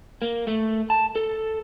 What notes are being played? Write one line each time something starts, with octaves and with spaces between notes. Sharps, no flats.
A#3
A3
A5
A4